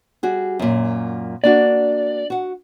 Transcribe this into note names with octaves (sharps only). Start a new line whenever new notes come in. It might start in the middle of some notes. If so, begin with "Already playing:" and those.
G3 F#4 G#4
F#2 A#2
A#3 D4 F#4 D5
F#4 F#5